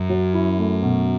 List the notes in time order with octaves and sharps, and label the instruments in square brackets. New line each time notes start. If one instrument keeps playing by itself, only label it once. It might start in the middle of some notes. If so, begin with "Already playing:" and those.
Already playing: [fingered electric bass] F#2
[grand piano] F#3
E4
A3
B2